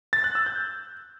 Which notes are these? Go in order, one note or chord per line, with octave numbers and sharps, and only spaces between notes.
A6
F#6
E6
G6